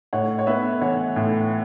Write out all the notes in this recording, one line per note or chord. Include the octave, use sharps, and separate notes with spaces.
A2 C#5 F#5
C#5
B3 B4 E5
E3 C#5 F#5
A2